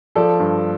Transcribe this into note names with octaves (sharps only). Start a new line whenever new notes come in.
F3 A4 D5
G2